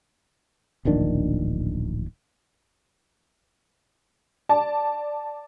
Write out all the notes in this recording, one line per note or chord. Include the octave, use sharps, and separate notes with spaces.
D1 A#1 D#3 D4
D5 A5